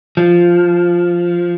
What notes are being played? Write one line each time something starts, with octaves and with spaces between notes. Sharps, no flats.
F3